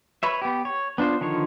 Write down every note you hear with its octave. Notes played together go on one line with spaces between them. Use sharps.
B4 C#5 E5
B3 G4
C#5
B3 D4 F4 C5
D3 D#3 F3 C#5